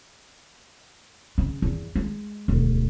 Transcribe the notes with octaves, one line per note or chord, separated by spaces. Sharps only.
C#3
E2
G#3
E1 D2